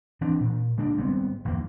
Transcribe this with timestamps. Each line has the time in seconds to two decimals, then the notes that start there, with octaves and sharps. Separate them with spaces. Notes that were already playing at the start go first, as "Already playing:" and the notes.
0.21 E3 C4 D4
0.40 A#2
0.77 C#3 G#3 A#3 D4
0.97 G#1 G3 B3 C4
1.45 G1 E2 G2 A#3